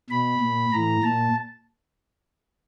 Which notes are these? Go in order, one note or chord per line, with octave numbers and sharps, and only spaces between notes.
B2 B5
A#2
A2 E3 A#5
A#2 A5